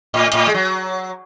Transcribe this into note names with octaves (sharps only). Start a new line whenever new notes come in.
A2
A2
G#3
F#3